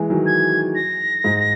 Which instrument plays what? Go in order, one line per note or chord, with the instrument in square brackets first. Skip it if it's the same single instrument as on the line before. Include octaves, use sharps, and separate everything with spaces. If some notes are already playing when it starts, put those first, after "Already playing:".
Already playing: [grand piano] E3 G#3
D#3 F#3
[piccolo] G#6
A#6
[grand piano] G#2